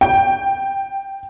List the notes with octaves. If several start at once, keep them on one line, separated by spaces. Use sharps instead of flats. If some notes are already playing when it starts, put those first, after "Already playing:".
G5